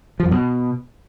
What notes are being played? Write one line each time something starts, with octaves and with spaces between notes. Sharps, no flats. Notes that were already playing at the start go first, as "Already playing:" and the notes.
F3
F#2
B2